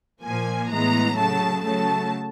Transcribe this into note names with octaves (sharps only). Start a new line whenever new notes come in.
A#2 F3 A#3 G#5
A2 E3 G#3 B3 A#5
C#3 F#3 A3 A5
C#3 F#3 A3 A5